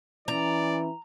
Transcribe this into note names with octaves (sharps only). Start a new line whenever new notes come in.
E3 C#4 D5 A#5